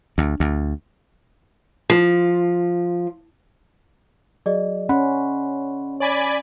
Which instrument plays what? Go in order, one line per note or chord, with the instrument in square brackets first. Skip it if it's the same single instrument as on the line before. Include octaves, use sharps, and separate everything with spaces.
[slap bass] D2
D2
[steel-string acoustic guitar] F3
[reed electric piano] F#3 [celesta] G#4 D5 D#5
[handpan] C#4 [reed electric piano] F#5 B5 C6
[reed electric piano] C#5 [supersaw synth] D5 G#5 B5